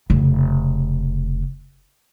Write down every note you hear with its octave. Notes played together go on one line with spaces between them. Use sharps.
F1 C#3